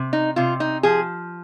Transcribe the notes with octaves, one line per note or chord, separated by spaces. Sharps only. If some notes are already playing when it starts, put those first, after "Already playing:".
Already playing: C3
D#4
C3 F4
D#4
F3 G#4